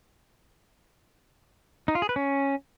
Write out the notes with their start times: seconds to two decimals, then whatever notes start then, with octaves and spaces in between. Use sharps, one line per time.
1.88 D#4
1.95 F4
2.02 G#4
2.09 B4
2.16 C#4